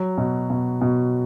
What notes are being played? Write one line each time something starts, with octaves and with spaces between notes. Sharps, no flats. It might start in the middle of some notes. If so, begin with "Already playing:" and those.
Already playing: F#3
B2
B2
B2